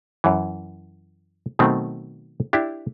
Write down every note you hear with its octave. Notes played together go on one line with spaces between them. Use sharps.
F#2 E3
B2 D#3 F#3 A3 C4
D4 E4 G4